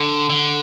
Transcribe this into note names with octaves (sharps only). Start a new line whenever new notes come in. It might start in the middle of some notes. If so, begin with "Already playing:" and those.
Already playing: D3
D3